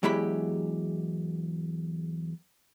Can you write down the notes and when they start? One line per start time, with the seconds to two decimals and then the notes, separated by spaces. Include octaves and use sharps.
0.03 E2 F#3 G#3 E4 G4 B5